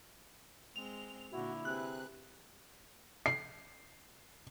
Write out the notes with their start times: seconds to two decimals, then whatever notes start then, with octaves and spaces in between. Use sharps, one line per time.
0.76 G#3 C4 F7
1.33 A#2 D3 E4 F#4
1.65 C3 G#4 B4 F#6
3.26 C7